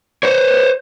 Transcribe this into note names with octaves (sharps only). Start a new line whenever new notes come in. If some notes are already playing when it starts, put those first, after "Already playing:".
C5 C#5